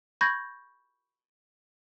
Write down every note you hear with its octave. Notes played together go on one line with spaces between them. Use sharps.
B5 C#6 G6 G#6 A#6